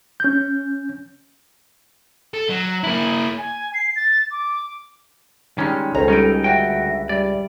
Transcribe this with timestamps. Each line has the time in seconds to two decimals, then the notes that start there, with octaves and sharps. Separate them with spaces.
0.20 C#4 G6
2.34 A4
2.49 F#3
2.84 A#3 E4
3.38 G#5
3.74 C7
3.96 A6
4.31 D6
5.58 D#3 G3 G#3 C#4
5.95 C#2 A4 C5 C#5 G#5 A#5
6.08 G3 C#4 D#4 D7
6.44 D2 F#4 E5 G5
7.09 G3 D5